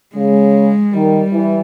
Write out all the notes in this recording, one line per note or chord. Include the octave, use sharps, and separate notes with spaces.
C#3 G#3
D#3 G3
E3